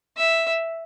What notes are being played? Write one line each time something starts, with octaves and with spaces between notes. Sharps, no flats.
E5